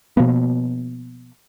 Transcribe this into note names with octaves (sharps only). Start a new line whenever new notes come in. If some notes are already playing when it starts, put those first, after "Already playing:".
B2 F3 A#3 B3